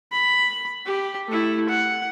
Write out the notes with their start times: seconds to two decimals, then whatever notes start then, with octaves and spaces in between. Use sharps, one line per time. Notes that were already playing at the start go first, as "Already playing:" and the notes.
0.12 B5
0.86 G4
1.28 A3 E4
1.69 F#5